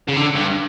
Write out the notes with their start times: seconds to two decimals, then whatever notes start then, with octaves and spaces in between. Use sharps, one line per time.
0.08 C#3
0.16 D3
0.35 G2